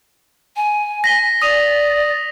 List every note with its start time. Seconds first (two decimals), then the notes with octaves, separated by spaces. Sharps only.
0.56 G#5
1.04 A#6 B6 G7
1.42 D5 D#6 D#7 F7